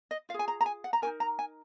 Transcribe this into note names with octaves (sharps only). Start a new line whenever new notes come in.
D#5
F4 F5
G#4 G#5
A#5
A#5
G#5
F#5
A#5
D#4 F#4 A#4 G#5
A#5
G#5